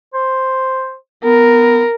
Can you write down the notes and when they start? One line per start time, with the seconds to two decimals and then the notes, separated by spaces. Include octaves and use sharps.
0.14 C5
1.24 B3 A#4